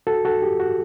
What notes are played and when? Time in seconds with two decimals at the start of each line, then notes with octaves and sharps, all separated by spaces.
0.07 F#4 A4
0.25 F#4 A4
0.42 G4
0.60 F#4